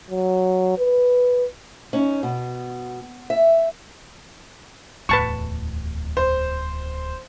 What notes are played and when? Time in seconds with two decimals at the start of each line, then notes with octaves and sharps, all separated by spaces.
0.10 F#3
0.78 B4
1.93 C#4 D#4
2.23 B2
3.30 E5
5.09 D1 E2 B4 A5 C#6
6.17 C5